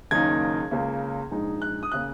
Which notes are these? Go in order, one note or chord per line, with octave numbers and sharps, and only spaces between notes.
F#1 F#2 D#3 A#3 D#4 G#6
C#2 C#3 A#3
A#1 G#2 G#3 D#4
F#6
D#6
C#3 A#3 F#6